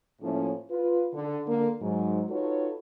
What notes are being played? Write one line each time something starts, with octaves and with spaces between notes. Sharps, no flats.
A2 F3 A3 A#3 C#4
F4 B4
D3
D3 A#3
G#2 F#3
D#4 F4 F#4 A4 B4 C#5